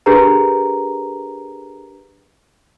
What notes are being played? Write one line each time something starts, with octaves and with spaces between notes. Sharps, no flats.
D4 G4 G#4 A#4 B4 A#5